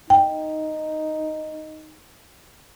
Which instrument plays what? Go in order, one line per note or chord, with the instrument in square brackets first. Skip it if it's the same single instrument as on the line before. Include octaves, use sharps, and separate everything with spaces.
[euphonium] D#4 [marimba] G5